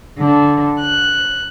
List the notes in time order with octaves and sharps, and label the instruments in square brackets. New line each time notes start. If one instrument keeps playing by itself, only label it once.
[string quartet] D3
F#6